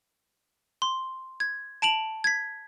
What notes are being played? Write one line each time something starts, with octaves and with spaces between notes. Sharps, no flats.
C6
G#6
A5 D7 F7 F#7
G#6 B6